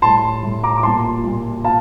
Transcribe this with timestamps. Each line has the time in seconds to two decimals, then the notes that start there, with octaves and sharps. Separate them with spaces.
0.02 A2 G3 A5 C6
0.43 A2 G3
0.63 A#5 D6
0.78 D6
0.83 A#2 G3 A5 C6
1.24 A#2 G3
1.65 A#2 F5 A5